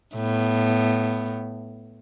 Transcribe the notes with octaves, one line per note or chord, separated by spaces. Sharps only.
A2 B3